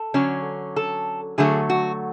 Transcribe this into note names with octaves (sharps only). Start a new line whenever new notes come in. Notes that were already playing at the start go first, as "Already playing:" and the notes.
Already playing: A4
D3 F#3 C#4
A4
D3 F#3 A3 G#4
F#4